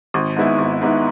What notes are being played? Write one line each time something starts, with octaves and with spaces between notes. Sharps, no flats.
G#1
G#2 G#3 B3 E4
G#1
G#2 G#3 B3 E4